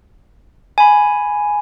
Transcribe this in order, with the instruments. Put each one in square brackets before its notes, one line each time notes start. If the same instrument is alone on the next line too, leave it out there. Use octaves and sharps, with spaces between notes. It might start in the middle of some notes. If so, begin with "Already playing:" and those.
[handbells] G#5 B5